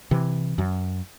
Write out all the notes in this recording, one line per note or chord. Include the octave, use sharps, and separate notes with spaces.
C3 E3
F#2